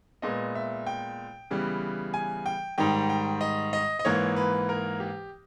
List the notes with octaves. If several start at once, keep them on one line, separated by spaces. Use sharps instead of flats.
A#2 G#3 B3 D#5
E5
G5
C#3 E3 G3 B3
G#5
G5
G#2 D#3 G3 G5
G5
D#5
D#5
D#5
G#2 E3 A#3 C#5
B4
A#4
G4